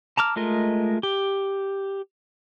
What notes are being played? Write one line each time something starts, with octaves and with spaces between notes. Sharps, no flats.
A5 A#5 D6 F6
G#3 A3 F4 A#4 D#5
G4